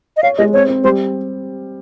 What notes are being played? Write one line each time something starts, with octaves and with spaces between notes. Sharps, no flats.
D#5
C#5 F5
G#3 D#5
C4 C#5
C4
G3 C5